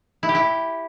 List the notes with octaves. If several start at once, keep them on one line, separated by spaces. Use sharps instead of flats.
E4
G4
E4